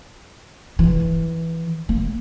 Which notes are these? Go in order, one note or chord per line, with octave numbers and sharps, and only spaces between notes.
E3
A#3